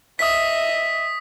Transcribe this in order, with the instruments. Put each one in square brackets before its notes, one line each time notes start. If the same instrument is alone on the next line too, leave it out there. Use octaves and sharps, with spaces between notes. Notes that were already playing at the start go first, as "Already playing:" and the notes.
[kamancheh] D#5 E5 [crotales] D#6 B6